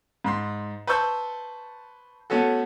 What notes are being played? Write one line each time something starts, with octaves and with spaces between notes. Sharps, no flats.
G#2 B5 C6
B4 C5 A5 C#6 E6 G6
A3 B3 C#4 F#4 A4